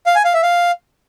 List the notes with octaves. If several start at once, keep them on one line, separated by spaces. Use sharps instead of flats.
F5
G#5
F5
E5
F5